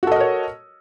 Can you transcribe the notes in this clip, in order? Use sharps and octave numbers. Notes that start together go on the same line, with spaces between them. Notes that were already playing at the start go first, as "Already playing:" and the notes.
F#4 A4 A#4 C#5 D#5